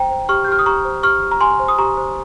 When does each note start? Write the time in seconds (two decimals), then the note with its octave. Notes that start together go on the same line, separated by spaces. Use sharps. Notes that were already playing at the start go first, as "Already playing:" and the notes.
Already playing: C5 G5 A#5
0.10 C5
0.29 G4 C#6 F6
0.45 G6
0.48 G4 F6
0.59 D#6
0.66 G4 A#5 C#6
0.85 C5
1.03 G4 C#6 F6
1.22 G4
1.31 A#5
1.41 G4 G#5 C6
1.60 C5
1.68 D#6
1.78 G4 A#5 C#6
1.97 C5